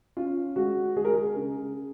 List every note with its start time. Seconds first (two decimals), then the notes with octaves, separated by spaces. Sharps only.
0.17 C#4 F4
0.56 G#3 F#4
0.96 G#3 G#4
1.05 A#4
1.14 G#4
1.36 C#3